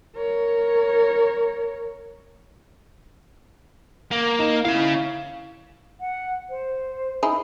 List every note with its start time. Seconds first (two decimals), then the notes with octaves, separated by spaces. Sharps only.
0.15 A#4 C#5
4.11 A#3
4.39 D#4 E7
4.65 C#4 E4 F5
6.00 F#5
6.50 C5
7.23 D#4 E4 G#4